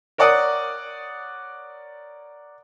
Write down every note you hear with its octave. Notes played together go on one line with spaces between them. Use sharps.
A#4 C#5 D5 F#5 D6 D#6